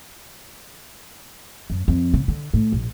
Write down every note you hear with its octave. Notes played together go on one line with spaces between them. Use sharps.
F#2
F2
C#3
D3
A2
A#1